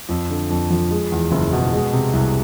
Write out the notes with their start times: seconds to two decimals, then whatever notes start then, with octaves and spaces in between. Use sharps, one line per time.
0.09 F2
0.30 D3
0.50 F2
0.70 F3
0.91 G#3
1.12 E2
1.32 F#1
1.52 B2
1.73 G#3
1.93 C3
2.13 C2